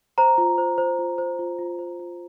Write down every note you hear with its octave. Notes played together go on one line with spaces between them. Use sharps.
C5 A#5
F4
C5
C5
F4
C5
F4
F4
C5
F4